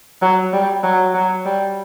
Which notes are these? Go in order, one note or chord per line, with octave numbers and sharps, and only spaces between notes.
F#3
G3
F#3
F#3
G3